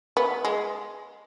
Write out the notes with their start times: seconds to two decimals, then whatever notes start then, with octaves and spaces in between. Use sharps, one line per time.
0.17 B3
0.45 G#3